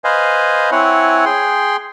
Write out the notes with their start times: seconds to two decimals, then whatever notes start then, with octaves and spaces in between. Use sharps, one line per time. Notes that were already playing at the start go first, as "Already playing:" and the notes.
0.04 B4 C5 D#5 F5 G#5
0.71 C4 E4 C#5 F#5 G#5
1.25 G#4 G5 C6